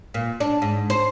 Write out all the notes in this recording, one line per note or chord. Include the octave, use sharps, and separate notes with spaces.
A#2
D4
G#2
C5